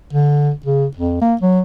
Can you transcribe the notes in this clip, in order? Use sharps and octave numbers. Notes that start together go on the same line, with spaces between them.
D3
C#3
F2
A#3
F#3